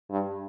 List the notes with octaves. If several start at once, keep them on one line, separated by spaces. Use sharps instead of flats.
G2